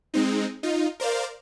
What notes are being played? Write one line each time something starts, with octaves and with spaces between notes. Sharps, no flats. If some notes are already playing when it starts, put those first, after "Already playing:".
G#3 C4 D#4
D#4 F4
A#4 C5 D5 F5